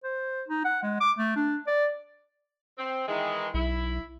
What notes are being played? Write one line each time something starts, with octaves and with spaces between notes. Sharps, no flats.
C5
D#4
F#5
G#3
D6
A3
D4
D5
C4
D#3 E3 G#3
B1 E4